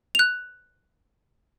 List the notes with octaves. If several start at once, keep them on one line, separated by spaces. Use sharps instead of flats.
F#6 F7